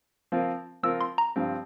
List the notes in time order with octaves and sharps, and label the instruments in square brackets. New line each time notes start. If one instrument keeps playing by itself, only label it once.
[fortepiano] F3 C4 F4 A#4
[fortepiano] F3 C4 F4 A#4 [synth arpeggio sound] E6
[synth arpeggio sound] C6
A#5
[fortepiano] G2 F3 C4